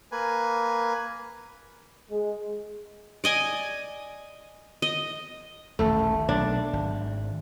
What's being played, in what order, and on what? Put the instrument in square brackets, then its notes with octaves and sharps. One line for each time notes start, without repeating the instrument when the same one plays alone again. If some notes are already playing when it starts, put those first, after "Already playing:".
[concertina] A#3 B4 G#5
[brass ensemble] G#3
[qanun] D5 D#5 G#5
D#5
[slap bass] D#1 A1 D#2 [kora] A3
[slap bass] B1 [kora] D4
[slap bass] G#1